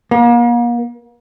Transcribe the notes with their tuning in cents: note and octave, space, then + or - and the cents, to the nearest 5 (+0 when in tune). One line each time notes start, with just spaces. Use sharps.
A#3 +40